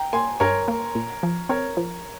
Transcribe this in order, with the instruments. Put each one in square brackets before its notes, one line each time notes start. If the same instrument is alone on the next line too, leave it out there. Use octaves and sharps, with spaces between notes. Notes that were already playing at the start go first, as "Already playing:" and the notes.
Already playing: [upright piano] G5 A#5
[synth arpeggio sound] A#3 [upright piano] G#5 C6
[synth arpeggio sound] G2 [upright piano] A#4 C#5
[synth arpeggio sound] A#3
A#2
F3
[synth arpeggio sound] C4 [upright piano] A#4 C#5
[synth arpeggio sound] F3